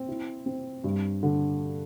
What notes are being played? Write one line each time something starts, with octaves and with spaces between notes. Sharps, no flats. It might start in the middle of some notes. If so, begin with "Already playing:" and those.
Already playing: C4
E4
C4
G2
D3